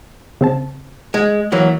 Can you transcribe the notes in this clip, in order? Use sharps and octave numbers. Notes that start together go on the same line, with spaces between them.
C#3 C4 A5
G#3
E3 F#3 A#3